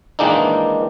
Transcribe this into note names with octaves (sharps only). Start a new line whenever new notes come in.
D#3 E3 G#3 A#3 D4 D#4